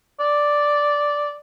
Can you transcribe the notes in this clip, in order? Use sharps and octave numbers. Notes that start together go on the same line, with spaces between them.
D5